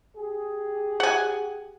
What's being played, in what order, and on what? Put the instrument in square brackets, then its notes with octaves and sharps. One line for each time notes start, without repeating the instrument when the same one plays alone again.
[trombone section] G4 G#4
[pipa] F#5 G#5